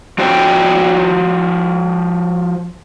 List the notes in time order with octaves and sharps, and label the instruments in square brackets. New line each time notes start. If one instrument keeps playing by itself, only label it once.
[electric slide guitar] F3 F#4 C5 C#5 F5 G5